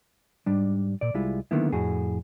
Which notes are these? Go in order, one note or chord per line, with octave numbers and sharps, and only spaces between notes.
G#2 G3 D4
A#2 D5
C2 G3 G#3 E4 F4
D3 D#3 F#3 A#3 B3 E4
F2 A2 F#4 G#4